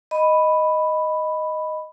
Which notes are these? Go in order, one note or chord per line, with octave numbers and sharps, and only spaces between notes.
D#5 B5